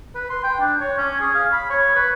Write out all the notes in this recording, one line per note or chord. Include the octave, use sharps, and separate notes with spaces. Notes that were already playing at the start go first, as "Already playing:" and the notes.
B4
C6
G5
D4
C#5
C#4
G#4
F5
B5
C#5
B4